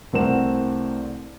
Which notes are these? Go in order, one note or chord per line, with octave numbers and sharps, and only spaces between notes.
C2 A3 C4 A#4 F#5 E7